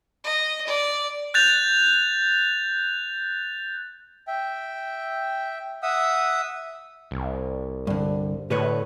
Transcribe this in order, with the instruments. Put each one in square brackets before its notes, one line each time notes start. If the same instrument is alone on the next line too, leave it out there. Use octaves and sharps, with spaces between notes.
[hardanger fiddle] D#5
D5
[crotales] F#6 G6 A6 F7
[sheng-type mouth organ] E5 G5
E5 F#5 D#6 E6
[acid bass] C2
[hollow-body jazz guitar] G2 D3
[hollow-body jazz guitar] D2 B4 C#5 [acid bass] A2